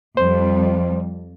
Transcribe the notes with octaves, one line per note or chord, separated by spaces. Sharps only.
F2 G3 C5